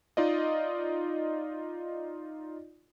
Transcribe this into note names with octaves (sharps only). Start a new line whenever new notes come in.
D#4 F4 D5 D#5